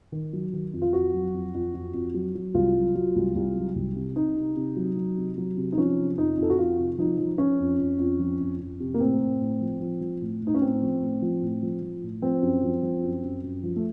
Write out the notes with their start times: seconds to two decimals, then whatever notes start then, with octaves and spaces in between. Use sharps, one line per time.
0.12 D#3
0.33 F#3
0.53 D#3
0.73 F2
0.82 F4
0.93 F2 F#4
1.14 F#3
1.34 F2
1.54 F2
1.74 F2
1.94 F2
2.14 F#3
2.35 F#3
2.54 C2 F4
2.75 F#3
2.95 F#3
3.15 C2
3.35 C2
3.56 F#3
3.75 C2
3.96 C3
4.16 C3 D#4
4.37 C3
4.56 C3
4.76 F#3
4.97 F#3
5.17 C3
5.38 F#3
5.57 C3
5.72 D#4
5.78 F3 C#4
5.98 C3
6.18 F2 D#4
6.38 F2 A4
6.50 F#4
6.58 F2 F4
6.78 C3
6.98 F3 D#4
7.19 F3
7.38 F3 C#4
7.60 F2
7.79 F2
7.99 F2
8.19 F3
8.40 F2
8.60 F2
8.80 C3
8.94 A#3
9.00 A2 C4
9.20 A2
9.41 A2
9.61 F3
9.80 F3
10.01 F3
10.21 A2
10.42 A2
10.47 D#4
10.54 C#4
10.62 A2 C4
10.82 F3
11.01 A2
11.22 F3
11.42 A2
11.63 F3
11.82 F3
12.03 A2
12.22 F3 C4
12.42 F#2
12.63 F3
12.83 F3
13.03 F#2
13.24 F#2
13.44 F#2
13.63 F3
13.76 A3